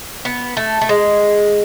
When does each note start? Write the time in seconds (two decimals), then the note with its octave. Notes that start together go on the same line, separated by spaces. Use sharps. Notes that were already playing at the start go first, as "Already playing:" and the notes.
0.25 B3
0.57 A3
0.81 A3
0.89 G#3